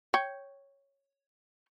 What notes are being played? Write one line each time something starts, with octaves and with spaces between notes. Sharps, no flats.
C#5 G5